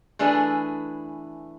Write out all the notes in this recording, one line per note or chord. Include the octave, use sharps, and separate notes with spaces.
E3 A3 D4 G#4 B4